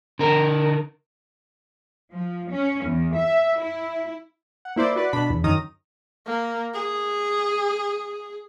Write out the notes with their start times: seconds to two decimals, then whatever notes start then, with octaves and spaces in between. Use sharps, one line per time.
0.19 D3 A#4
2.11 F3
2.52 C#4
2.84 E2
3.14 E5
3.59 E4
4.65 F#5
4.76 A#3 E4 C5 D5
4.96 F#4 B4 D5
5.13 B2 D4 B5
5.30 E2
5.44 F#2 D#3 A#5 D#6
6.26 A#3
6.74 G#4